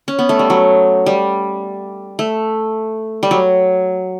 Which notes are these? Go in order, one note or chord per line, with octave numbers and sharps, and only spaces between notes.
C#4
B3
A3
G3
F#3
G3
A3
G3
F#3